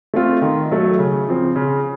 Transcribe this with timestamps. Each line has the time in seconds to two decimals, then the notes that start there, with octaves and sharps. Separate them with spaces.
0.14 A3 C4 F4
0.42 D#3
0.71 F#3 A3
0.99 C#3
1.28 F3 C4
1.56 C#3